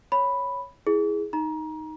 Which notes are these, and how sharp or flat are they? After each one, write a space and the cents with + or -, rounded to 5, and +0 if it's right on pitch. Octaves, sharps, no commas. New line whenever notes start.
C#5 +0 B5 +0
E4 +0 G#4 +0
D#4 +0 A#5 +25